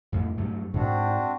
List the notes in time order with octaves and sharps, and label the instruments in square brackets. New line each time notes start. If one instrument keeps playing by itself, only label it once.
[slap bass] F2 A2
G2 F#3 A3
[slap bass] G#2 [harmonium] C4 D4 F#4